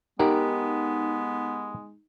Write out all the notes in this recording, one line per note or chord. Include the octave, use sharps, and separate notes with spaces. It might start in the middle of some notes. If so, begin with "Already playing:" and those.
G#3 B3 D#4 G4 A#4 F#5